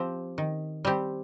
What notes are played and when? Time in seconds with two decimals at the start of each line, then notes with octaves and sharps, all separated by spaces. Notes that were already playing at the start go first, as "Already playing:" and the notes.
Already playing: F3 C4 G4
0.38 D#3
0.85 G3 C4 G4